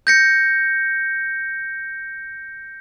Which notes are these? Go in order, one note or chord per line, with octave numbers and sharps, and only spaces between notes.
G6 A#6 C#7